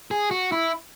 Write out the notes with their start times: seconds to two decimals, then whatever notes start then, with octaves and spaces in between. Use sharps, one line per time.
0.11 G#4
0.31 F#4
0.52 E4